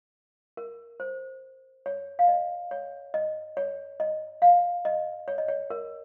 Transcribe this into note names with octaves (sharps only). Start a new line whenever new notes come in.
A#4
C5
C#5
F5
D#5
C#5
D#5
C#5
D#5
F5
D#5
C#5
D#5
C#5
A#4